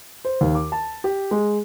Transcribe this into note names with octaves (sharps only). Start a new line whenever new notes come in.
C5
D#2
D6
A5
G4
G#3